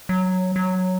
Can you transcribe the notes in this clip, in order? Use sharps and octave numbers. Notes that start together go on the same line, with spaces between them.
F#3
F#3